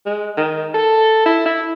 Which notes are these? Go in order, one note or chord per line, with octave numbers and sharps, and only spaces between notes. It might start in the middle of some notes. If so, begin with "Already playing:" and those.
G#3
D#3
A4
E4
E4